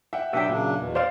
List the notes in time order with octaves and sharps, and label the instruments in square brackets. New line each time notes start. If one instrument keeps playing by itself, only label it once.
[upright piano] E5 F#5 G5
[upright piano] B2 D4 [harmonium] F#3 G4 F#5 [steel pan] E5 G5
[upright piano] A#2 [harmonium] C#3 F#3 D4
[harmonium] E2 B2
[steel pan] C5 D5 F5